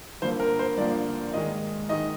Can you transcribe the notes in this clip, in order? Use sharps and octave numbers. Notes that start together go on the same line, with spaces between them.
G2 D3 F3 A#3 C5
A#4
C5
G2 D3 F3 A#3 D5
G#2 D#3 G#3 D#5
G#2 D#3 G#3 D#5